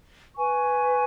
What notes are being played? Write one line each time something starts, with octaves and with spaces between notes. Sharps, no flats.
B4 G#5 C#6